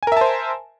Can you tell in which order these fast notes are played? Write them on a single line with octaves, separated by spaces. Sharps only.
G#5 A#4 E5 A5 C5